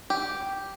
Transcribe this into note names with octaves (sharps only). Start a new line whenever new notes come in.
G4